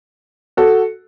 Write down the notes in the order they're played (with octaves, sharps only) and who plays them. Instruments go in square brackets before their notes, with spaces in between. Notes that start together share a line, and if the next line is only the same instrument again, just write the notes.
[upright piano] F#4 A4